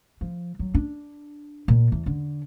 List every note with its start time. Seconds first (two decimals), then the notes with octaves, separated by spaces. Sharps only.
0.21 F3
0.59 F#3
0.75 D4
1.68 A#2
1.92 E2
2.06 D3